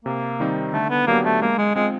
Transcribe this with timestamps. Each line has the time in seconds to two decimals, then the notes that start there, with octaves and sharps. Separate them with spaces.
0.05 C3 A#3
0.40 D#3 G3 C4 D#4
0.73 D3 A3
0.90 B3
1.07 F#3 A#3 B3 D4 G4
1.25 A3
1.42 G#3 A#3
1.58 G#3
1.75 G#3 C4 F4